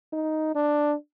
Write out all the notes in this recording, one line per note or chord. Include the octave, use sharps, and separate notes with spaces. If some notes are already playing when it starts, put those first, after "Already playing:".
D#4
D4